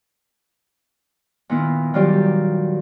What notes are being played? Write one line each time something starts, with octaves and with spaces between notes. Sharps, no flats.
A#2 D#3 A#3 B3 E4
D#3 F#3 G3 F4 G4 D5